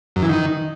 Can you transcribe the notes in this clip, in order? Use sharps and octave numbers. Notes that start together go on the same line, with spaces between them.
F#2
E3
D#3